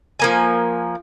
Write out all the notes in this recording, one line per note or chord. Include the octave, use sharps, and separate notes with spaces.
F3 A#3 G#5